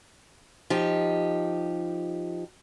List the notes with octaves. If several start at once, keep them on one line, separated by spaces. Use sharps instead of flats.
F3 D#4 G4